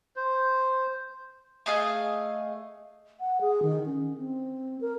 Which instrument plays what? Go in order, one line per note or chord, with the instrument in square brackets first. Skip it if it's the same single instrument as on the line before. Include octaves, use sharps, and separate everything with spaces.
[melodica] C5
[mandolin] A3 G#4 D#5 F5
[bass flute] F#5
G#4
D#3
C#4
C4
A#4